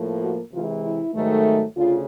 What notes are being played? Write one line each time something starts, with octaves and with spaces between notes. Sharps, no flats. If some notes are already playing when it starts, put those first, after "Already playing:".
Already playing: A2 F3 A#3
F#4
C3 E3 G#3 F4
E4
G#2 D#3 F#3 A3
D2 C#3 F4